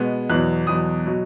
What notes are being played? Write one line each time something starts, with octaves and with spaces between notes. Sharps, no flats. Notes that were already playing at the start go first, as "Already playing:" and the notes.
Already playing: B2 G#3 B3
E2 B2 F#3 F#6
E2 B2 F#3 D#6
B2 F#3